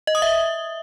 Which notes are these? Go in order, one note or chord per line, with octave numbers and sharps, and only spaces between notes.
D#5
D#6
E5